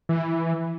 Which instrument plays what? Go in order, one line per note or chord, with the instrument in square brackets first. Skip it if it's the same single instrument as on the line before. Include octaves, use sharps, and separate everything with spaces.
[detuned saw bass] E3